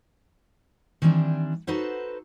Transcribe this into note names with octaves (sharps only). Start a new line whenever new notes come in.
D#3 E3 G3 C4 D4
D#4 F#4 A4 B4 C5 F#5